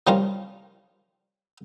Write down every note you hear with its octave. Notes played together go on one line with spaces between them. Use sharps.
C3 F3 G3 C#4 F4 A#4